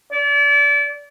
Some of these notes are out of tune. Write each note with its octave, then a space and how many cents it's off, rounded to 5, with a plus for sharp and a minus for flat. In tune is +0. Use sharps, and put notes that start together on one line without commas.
D5 -35